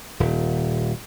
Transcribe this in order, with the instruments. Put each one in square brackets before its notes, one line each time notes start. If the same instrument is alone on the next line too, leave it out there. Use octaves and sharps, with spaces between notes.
[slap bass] D#1